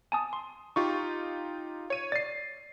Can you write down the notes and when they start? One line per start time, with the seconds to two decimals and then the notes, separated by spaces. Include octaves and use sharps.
0.12 G#5 A5 D#6
0.33 C6
0.76 D#4 F4 G4 C#6
1.90 C#5 D#7
2.12 D5 A6 C7